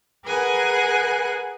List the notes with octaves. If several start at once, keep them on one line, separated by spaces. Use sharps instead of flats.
G#4 A#4 B4 F#5 G#5 F#6